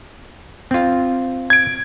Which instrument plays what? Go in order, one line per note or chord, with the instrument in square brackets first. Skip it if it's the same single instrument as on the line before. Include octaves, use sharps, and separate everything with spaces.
[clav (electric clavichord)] C4 F4
[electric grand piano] G#6 D7